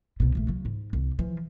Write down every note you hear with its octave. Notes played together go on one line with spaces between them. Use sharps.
C2 B2
A#1 A3
C#3 F#3
G#2
C2
E3 F3